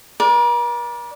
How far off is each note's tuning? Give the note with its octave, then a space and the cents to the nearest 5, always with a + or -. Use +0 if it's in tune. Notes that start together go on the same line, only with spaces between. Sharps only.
A#4 +45 D5 +0